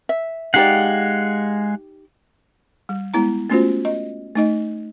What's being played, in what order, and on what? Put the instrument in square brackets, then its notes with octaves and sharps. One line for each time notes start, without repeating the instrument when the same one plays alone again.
[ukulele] E5
[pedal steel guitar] G#3 F5 F#5 [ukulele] D#4 G4 D5
[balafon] G3
G#3 B3 E4 A#5
A3 B3 C#4 F4 F#4 C5
D#5
A3 D#4 D#5